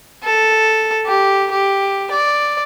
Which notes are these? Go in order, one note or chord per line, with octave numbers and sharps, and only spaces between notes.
A4
G4
G4
D5